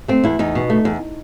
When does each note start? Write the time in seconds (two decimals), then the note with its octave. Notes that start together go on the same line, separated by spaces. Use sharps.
0.08 A3 C4
0.24 E2 E4
0.39 E2 D#4
0.55 B2
0.70 A3
0.85 E2